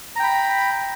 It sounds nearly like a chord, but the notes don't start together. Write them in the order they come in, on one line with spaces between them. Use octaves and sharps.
A#5 G5 B5